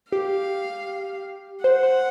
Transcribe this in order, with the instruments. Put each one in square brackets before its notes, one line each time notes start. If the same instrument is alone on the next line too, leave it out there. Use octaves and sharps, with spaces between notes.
[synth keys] G4 [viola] F5
[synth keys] C5 [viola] F#5
[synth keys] C5